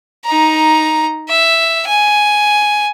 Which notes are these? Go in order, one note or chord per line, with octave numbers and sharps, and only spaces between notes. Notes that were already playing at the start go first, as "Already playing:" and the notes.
D#4 A#5
E5
G#5